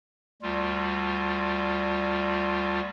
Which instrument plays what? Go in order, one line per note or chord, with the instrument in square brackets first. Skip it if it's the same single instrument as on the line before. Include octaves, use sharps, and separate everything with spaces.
[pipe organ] D2 G3 F4